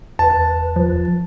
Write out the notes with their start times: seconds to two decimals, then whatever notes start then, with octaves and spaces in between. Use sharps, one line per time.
0.19 E2 B4 A5
0.76 F3